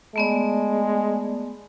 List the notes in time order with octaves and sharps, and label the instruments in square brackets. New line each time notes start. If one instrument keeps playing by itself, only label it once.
[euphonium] G#3 [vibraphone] A3 B3 D5